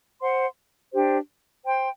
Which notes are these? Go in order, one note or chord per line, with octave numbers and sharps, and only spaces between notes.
C5 F#5 C6
D4 G4 C5
C5 G5 C6